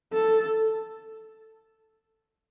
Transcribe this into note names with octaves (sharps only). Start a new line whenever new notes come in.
A4